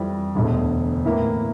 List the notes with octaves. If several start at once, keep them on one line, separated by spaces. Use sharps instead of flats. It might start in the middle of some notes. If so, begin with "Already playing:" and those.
Already playing: F2 E3 G3
E1 D2 D3
A2 E3 A#3 E4